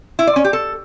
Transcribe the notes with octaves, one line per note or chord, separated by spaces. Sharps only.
E4
D5
C#4
G4
A4